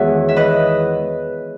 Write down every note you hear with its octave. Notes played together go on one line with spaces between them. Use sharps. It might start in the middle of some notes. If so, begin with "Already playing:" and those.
Already playing: E2 D#3 G#3 F#4 G#4 C#5 E5 F#5
E5
B4 D#5